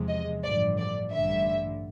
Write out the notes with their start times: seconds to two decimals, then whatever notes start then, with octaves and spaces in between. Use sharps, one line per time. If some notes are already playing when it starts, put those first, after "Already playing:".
Already playing: E2 C3 F3 G#3
0.08 D#5
0.43 A1 G2 D3 F3 D5
0.78 D5
1.12 A1 G2 D3 E5